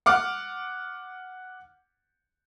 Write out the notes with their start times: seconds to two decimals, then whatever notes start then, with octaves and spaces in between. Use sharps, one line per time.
0.06 F#5 D6 F6